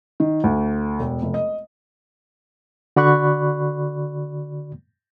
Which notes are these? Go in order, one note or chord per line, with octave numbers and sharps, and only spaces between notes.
D#3
D2
E1
F1
D#5
D3 F#4 D5 B5 C#6 F#6